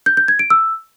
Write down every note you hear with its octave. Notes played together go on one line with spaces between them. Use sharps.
G6
G6
G#6
D7
E6